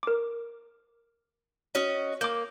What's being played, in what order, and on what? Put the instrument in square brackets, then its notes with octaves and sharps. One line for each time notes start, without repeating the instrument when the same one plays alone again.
[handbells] A#4 D6
[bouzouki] C#4 F#4 D#5
[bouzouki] A#3 [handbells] D6 G6